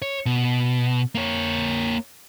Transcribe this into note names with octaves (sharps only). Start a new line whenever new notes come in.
C#5
B2
A#3 C#5